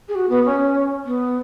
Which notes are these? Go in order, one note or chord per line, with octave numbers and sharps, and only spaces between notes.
G#4
F#4
B3
C#4
B3